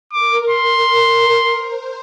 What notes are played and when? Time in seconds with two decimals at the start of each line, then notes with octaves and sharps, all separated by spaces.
0.13 A#4 D6
0.49 C6
1.56 C5